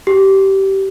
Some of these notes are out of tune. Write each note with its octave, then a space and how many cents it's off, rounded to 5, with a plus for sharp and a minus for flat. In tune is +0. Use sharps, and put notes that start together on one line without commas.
G4 -20